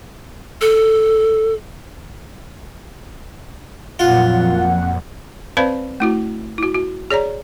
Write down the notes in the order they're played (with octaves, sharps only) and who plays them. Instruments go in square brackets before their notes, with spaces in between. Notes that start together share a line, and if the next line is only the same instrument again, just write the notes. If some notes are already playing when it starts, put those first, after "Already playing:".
[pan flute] A4
[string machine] F2 [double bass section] A#2 F#3 [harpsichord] F4 [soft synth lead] F#5
[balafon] C4 B4 C5 D5 F5 B5
A3 E4 F#4
E4 F#4
F#4
G#4 C#5 D5 A#5